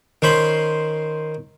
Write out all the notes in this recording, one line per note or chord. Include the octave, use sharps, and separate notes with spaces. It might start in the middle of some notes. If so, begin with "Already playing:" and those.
D#3 C#4 C5 B5 C6